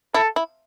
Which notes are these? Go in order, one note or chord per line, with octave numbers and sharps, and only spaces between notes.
E4 A4
E4